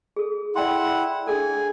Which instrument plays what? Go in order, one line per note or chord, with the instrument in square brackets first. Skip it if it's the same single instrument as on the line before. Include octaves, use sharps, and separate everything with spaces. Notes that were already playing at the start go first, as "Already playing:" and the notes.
[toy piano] G#4 A4
[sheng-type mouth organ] E4 F#5 [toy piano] D5 G5 C6
[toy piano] D4 G#4 A4 [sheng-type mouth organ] G#5